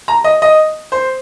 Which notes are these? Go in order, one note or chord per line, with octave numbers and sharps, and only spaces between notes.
A#5
D#5
D#5
C5